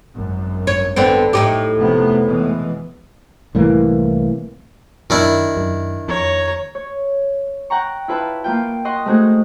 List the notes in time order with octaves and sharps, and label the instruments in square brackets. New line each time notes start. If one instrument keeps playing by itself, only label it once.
[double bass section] G#1 F#2
[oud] C#5
D3 B3 C4
A2 D#4 G4
[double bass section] F1 C3 B3
B2 E3 G#3
[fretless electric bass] C2 A2 E3 A#3
[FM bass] F#2 [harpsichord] D#3 D4 E4
[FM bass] F#2
[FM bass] F2 [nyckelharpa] C#5 A#5
[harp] C#5
F#5 G5 A#5 C#6
E4 F4 B4 E5 A5
A#3 F4 G5
D#5 F#5 C6 C#6
G#3 A3 C4 D#4 F#4 G#4